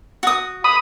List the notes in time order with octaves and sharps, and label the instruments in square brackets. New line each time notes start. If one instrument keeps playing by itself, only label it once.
[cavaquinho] F#4 D#6
[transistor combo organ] B5 D#6